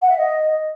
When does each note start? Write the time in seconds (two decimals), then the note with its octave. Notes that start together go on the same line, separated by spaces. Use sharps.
0.02 F#5
0.09 E5
0.17 D#5